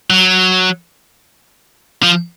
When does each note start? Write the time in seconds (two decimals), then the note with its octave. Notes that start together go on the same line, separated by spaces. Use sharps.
0.10 F#3
2.03 F3